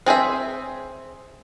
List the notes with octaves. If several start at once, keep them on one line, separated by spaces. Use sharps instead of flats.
C4 G#4 C5 E5